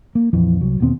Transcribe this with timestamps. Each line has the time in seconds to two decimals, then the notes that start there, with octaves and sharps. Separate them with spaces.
0.15 A#3
0.33 A#1 F2 E3
0.61 C2 F#3
0.80 E1 D#2 B2 C4